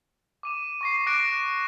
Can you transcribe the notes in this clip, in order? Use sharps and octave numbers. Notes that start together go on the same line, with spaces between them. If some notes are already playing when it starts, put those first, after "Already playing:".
D6 D#7 E7
C#6 A#6 C7
D6 F#6 A#6 D7 E7